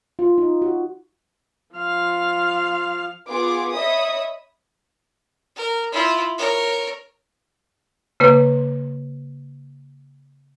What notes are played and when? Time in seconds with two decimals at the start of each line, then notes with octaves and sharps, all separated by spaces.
0.19 F4
0.38 D#4
0.62 F#4
1.76 F3 F5
3.29 B3 F4 G#4 D6
3.74 C#5 D#5 E5 B5 D#6
5.57 A#4
5.92 E4 F4
6.38 A#4 C#5
8.20 C#3 A#3 B4